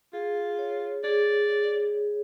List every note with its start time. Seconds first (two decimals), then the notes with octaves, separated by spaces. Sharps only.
0.13 F4 G#4
0.59 C#5
1.04 G#4 D5